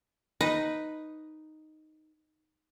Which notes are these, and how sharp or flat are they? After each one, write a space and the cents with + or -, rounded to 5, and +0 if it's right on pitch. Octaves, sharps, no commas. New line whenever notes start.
D#4 +0 B4 +0